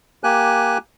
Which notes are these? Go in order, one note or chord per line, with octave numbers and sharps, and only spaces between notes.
A#3 G4 G#5 F#6